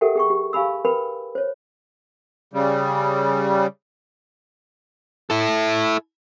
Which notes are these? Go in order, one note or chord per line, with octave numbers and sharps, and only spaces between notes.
G4 A4 A#4 E5 F#5 G5
G#4 G5 C#6
G4
G4 F5 G#5 B5 E6
A#4 B4 G5 B5
C5 C#5
C#3 G3
E4 A4